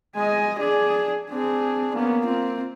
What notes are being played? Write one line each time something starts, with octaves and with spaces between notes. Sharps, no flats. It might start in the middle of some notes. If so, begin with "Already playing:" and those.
G#3 D#5 G#5
D4 G#4 D5
C4 D4 G#4
A#3 B3 C#4
C4 F4